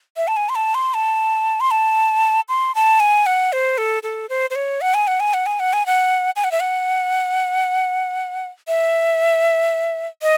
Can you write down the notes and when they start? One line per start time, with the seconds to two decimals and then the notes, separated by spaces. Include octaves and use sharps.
0.17 E5
0.28 A5
0.37 G#5
0.49 C6
0.55 A5
0.75 C6
0.94 A5
1.60 C6
1.71 A5
2.49 C6
2.75 A5
3.00 G#5
3.26 F#5
3.53 C5
3.78 A4
4.03 A4
4.29 C5
4.50 C5
4.55 C#5
4.81 F#5
4.94 G#5
5.07 F#5
5.20 G#5
5.34 F#5
5.46 G#5
5.60 F#5
5.73 G#5
5.86 F#5
6.36 G#5
6.44 F#5
6.52 E5
6.60 F#5
8.68 E5
10.22 D#5